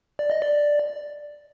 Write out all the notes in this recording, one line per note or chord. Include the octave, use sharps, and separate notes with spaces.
D5
D#5
D5